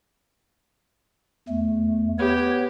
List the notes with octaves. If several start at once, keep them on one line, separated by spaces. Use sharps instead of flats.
E2 A3
B3 G4 C#5